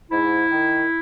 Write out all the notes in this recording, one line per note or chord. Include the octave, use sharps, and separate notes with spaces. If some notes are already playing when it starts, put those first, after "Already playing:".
G#2 E4
D#3